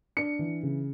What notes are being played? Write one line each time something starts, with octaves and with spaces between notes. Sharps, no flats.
D4 C#7
E3
C#3